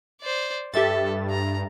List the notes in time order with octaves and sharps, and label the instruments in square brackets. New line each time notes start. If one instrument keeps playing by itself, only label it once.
[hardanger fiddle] C5 D5
[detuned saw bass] G2 [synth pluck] G4 E5 A6 [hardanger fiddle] A4
[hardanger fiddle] A#5